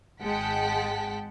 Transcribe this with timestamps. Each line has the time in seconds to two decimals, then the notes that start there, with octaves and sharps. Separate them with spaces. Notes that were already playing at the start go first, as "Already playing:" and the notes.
0.22 G#1 G#3 F#5 G5 A5 B6